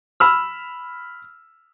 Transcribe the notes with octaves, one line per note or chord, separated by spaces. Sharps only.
B5 E6 F6